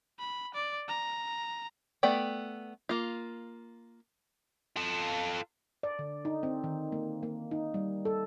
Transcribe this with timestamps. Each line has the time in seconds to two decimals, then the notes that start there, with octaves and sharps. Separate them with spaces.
0.19 B5
0.54 D5
0.88 A#5
2.03 A3 B3 D5 G5
2.89 A#3 F4
4.76 F4 A4
5.83 D5
5.99 D3
6.25 D#4
6.43 C4
6.64 D#3
6.92 A#3
7.23 A#3
7.51 D#4
7.74 G3
8.05 A4